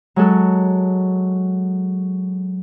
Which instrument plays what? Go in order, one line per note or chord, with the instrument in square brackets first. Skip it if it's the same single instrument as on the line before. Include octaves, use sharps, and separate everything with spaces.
[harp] F#3 G#3 A4